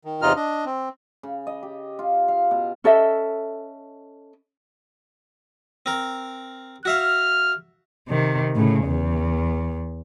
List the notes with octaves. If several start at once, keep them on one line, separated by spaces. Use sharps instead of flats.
D#3
E2 C3 D#4 F4 D#5 F6
D4 D#5
C4
C#3
D#5
G4
F4
F5
B2
C#4 A4 D#5 E5
C4 A#4
F#4 E5 F5 F6
C3 D#3
A2 C#3
E2